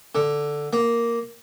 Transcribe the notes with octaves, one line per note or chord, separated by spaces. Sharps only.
D3
A#3